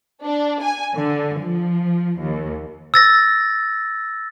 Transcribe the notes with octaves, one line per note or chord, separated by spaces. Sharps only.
D4
G#5
D3
F3
D#2
E6 A6 A#6